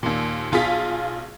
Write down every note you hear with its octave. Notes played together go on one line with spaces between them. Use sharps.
D#2 A#2
B1 F4 G#4 F5 B6